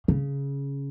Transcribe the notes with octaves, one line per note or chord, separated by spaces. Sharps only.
C#3